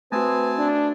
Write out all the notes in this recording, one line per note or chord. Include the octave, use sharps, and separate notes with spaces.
A3 C4 F#4 B4 G#5 A5
D4